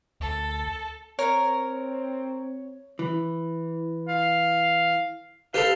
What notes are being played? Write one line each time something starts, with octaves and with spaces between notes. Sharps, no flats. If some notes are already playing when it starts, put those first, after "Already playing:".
D2 A4
C4 A#4 C#5
E3
F5
G4 A4 B4 C5 D5 F5